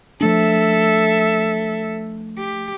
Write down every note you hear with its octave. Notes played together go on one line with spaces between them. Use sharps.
F3 A3 D4 A4 E5
G4